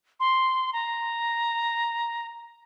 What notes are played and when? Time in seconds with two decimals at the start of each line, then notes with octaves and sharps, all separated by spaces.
0.20 C6
0.73 A#5